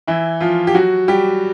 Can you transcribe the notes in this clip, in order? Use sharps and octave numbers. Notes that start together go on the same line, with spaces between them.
E3 E4
F3 F4
G4
F#3 F#4
G3 G4